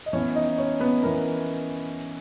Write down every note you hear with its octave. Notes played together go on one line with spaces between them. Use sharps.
D#5
E3 B3 C#4 C#5
D#4 D#5
C#4 C#5
B3 B4
E3 B3 A#4